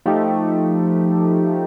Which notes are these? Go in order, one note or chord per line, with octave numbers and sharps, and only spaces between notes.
F3 A3 D#4 G4